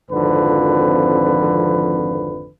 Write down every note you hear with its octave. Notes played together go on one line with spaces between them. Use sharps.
G#1 F2 D3 F3 B4